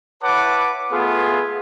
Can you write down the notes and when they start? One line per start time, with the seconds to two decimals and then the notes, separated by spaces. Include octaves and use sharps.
0.22 E4 B4 C#5 F#5 A5 D6
0.91 A3 B3 F4 G#4